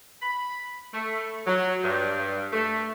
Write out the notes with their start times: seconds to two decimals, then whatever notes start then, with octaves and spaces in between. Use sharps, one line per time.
0.22 B5
0.94 A3
1.47 F#3
1.84 G2
2.53 A3